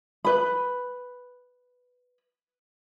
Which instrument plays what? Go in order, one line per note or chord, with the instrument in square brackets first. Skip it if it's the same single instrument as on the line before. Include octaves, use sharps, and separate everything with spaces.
[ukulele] B4 B5